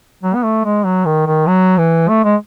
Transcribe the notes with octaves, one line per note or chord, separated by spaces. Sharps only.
F#3
B3
A3
G#3
F#3
D#3
D#3
F#3
E3
A3
G#3